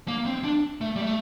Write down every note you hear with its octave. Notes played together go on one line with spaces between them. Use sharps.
A#3
C4
D4
A3
G3
A3